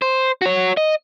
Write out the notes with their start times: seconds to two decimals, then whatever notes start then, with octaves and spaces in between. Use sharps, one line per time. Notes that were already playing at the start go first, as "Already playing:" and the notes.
0.02 C5
0.42 F#4 C#5
0.77 D#5